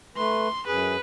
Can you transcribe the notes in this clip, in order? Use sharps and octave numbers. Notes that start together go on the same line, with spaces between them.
A3 B4 C6
F#2 G#4 B4